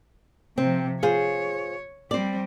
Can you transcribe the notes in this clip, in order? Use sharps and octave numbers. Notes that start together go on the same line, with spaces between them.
C3 F3 C4
F4 G#4 C5 C#5
G3 C4 C5 D5